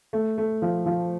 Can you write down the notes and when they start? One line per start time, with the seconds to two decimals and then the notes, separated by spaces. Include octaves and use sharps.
0.13 A3
0.38 A3
0.62 F3
0.86 F3